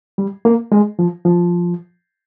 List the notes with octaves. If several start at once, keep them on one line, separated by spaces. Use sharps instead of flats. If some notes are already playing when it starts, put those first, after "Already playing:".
G3
A#3
G#3
F3
F3